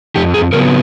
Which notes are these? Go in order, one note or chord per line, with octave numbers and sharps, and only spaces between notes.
F2 G4
G#4
C#3 F#3 B3 A#4